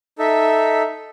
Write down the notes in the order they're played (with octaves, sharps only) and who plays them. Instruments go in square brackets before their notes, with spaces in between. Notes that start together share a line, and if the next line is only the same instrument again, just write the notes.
[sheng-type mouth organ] D#4 A4 E5